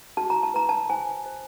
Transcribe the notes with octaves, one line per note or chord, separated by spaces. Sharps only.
F#4 A5
A#5
A5
B4 A#5
A5
C5 G#5
C5